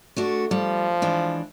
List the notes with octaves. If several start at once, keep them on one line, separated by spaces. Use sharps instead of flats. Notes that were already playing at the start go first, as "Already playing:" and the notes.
A3 D4 F#4
F3 G3
E3 G#3 D4